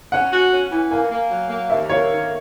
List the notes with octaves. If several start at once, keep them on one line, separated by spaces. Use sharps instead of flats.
C#4 F#5
F#4
C#4
E3
A#3 G#5
A#3
F#3
A#3
D#2 E5
A#3 C#5
D#3